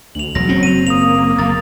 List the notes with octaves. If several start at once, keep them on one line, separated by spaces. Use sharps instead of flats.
D2 F7 F#7
E1 F#3 A#6
F#1 C4 C#4
D#7 F7
A#3 D#6 F7
F#1 A6